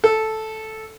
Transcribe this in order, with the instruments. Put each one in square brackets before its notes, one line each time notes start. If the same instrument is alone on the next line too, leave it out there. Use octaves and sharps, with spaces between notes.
[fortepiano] A4